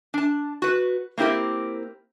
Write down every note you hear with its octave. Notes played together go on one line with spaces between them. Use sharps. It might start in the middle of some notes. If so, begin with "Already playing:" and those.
D4 A5
F#4 B4
A#3 C4 E4 G4 A#4